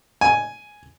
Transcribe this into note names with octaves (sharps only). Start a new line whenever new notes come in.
G#5